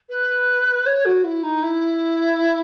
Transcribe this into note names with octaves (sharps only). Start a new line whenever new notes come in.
B4
C#5
F#4
E4
D#4
E4